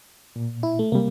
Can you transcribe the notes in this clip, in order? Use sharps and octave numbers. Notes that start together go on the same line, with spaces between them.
A#2
E4
A3
C3 G3 A#3